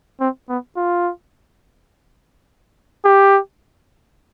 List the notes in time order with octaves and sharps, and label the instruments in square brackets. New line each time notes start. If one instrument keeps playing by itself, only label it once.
[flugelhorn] C4
B3
F4
G4